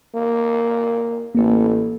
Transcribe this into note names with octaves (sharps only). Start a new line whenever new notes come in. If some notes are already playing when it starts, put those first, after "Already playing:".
A#3
A1 A#3 A4